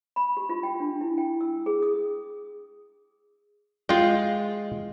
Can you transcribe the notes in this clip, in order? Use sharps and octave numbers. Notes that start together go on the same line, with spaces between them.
B5
G4
F4
G5
D4
E4
G5
E6
G#4
D#6
G#3 F4 G5